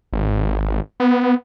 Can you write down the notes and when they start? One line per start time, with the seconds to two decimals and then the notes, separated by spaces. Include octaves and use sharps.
0.13 G#1
1.00 B3